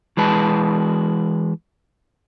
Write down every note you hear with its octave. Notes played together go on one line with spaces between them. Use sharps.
E3 G#3 B4 A5